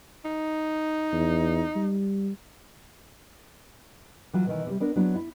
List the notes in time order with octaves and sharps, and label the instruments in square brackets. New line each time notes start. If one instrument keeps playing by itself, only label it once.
[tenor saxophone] D#4
[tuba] E2
G3
[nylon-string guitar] E3 F#3 F4
B2 D#3 E3
C3 G3
B3 D4 A#4
F#3 B3 D4 E4
E4